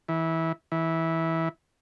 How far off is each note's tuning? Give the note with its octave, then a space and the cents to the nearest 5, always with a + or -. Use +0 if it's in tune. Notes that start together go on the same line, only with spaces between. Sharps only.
E3 -20
E3 -15